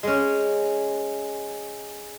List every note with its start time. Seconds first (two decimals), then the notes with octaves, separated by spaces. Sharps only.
0.03 G#3 C#4